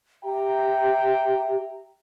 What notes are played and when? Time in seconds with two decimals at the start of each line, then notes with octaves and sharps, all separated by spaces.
0.24 G4 E5 G5 A#5